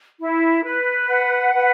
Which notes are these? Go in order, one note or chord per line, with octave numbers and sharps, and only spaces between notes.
E4
B4
F#5
B4